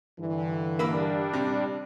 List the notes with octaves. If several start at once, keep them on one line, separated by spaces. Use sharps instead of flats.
G2 D3 E3
G3 A#3 D4 B5 E6
C3